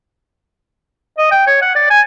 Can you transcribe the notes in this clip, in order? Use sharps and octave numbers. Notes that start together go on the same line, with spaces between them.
D#5
G5
C#5
F#5
D5
G#5